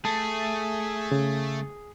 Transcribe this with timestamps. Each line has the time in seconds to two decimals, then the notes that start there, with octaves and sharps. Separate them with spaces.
0.05 A3 G#4 A5
1.12 C#3